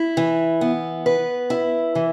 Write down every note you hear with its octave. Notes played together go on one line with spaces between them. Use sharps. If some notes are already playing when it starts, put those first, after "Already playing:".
Already playing: E4
E3
B3
B4
E4
E3